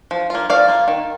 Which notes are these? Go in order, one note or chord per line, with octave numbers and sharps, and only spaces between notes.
F3
A#3 F4
F3 D5 F5
A#3 F4
D#3